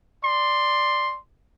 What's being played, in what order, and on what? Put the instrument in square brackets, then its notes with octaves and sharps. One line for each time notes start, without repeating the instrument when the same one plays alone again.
[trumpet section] D5 C6